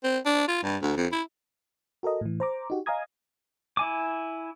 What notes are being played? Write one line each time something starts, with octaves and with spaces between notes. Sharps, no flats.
C4
D4
F4
G2
D2
F2
E4
F#4 A4 A#4 D#5
A2 E3
C5 A#5 D6
D#4 F#4 G4
D#5 F5 G#5 A#5 D#6 G#6
E4 G#5 D6